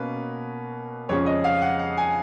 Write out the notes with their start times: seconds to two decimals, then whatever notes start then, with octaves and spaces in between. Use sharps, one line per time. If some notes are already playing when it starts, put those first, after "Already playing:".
Already playing: B2 A#3 C#4 B4
1.09 F2 C#3 G#3 C#4 C#5
1.26 D#5
1.44 F5
1.62 F#5
1.79 F#5
1.97 G#5